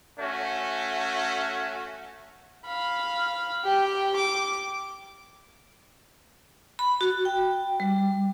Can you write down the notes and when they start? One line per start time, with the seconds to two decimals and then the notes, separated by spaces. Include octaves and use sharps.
0.20 A3 C#4 F#4
2.66 F5 B5
3.64 G4 G5
4.16 D6
6.79 B5
7.01 F#4
7.25 G5
7.80 G3